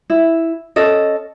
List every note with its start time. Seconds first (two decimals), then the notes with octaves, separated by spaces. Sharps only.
0.10 E4
0.76 C#4 A4 D#5